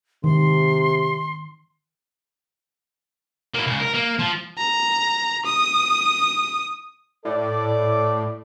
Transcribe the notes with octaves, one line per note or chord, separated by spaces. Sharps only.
C3 D#3 C6
A#3 E4
C#2 C#3
A#4
A#3
F3
A#5
D#6
A2 A4 D5